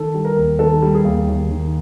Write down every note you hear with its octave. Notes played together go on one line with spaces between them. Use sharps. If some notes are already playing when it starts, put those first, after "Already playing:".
Already playing: D#3 A4
G3
A#4
D#2
D#3 A4
G3
G#4
D#2
D#2
D#3